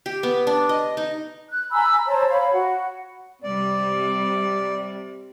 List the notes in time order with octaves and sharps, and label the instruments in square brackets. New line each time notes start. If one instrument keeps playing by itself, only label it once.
[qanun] G4
B3
D4
D#5
D#4
[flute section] F#6
G#5 A#5 B5 E6
C5 C#5 A5 A#5
C#5 F5 B5
F#4 F#5
[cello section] C3 G3 [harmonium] D5